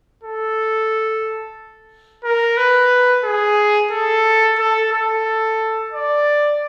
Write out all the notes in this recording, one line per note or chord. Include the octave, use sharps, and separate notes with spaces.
A4
A#4
B4
G#4
A4
A4
A4
D5